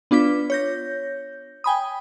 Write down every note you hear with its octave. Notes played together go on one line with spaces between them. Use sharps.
B3 D4 F4 D6 B6
C#5 G6 A#6
G5 G#5 B5 D#6